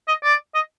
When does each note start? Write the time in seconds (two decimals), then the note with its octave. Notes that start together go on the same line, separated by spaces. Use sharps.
0.08 D#5
0.24 D5
0.55 D#5